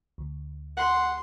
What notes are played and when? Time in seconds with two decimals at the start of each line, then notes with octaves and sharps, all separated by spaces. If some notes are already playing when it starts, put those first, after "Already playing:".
0.18 D2
0.77 F#5 C6